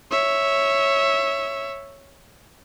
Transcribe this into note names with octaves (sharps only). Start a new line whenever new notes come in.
C#5 E5